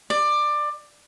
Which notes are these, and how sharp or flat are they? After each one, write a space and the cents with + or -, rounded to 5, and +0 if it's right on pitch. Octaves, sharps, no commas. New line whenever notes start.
D5 +20